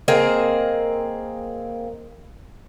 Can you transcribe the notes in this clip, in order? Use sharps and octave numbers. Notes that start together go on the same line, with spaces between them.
A#3 C4 G#4 D#5